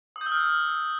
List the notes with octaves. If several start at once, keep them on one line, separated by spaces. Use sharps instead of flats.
D#6
G6
E6
F6